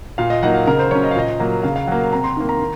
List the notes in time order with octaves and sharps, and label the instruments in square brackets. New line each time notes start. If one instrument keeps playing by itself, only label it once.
[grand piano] A#2 F5
D#5
F#3 A#3 D#4 F#5
F5
C#3 A#4
C5
F#3 C#4 C#5
D#5
F5
A#2 D#5
F#3 A#3
C#3 F5
F5
F#3 A#3 F#5
C3 A#5
C6
D#3 A#3
A#5
D#3